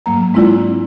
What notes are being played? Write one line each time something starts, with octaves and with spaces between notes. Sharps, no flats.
G#2 F#3 A#3 A#5
G#3 C4 D4 E4 F4 D5